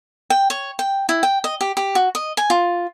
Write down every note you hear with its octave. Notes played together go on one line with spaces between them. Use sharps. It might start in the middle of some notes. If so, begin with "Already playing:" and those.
G5
C#5
G5
E4
G5
D#5
G4
G4
F#4
D#5
G#5
F4